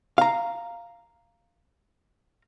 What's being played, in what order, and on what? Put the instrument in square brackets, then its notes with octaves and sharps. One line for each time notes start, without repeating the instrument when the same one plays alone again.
[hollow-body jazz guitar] F5 A#5